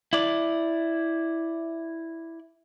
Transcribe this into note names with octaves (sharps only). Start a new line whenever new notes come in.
E4 D5